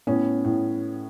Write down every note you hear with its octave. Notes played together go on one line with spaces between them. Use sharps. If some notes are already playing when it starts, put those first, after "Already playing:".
A2 B3 C#4
A2